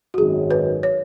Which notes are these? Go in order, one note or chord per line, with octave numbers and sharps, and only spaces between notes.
F#4
G#1 F#2 D#3 G#4
B4
C#5